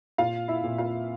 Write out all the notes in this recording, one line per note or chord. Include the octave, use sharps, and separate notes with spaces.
A#2 F4 F5
E4 E5
A#2
F4 F5